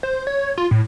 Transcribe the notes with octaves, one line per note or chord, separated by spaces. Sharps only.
C5
C#5
F4
A2